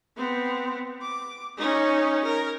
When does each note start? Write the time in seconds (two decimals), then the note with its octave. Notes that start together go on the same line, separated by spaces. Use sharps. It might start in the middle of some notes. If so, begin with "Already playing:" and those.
0.17 B3 C4
1.01 D6
1.57 C#4 D#4
2.25 A#4